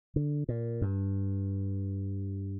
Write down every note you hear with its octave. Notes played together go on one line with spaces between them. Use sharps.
D3
A#2
G2